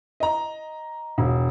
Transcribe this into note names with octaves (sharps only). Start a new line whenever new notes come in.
D#5 A#5
E1